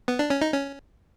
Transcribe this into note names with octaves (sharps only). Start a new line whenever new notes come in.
B3
D4
C#4
D#4
C#4